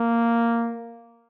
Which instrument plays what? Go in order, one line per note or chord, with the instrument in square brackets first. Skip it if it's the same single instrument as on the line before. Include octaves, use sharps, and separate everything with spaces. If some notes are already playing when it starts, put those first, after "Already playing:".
Already playing: [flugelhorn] A#3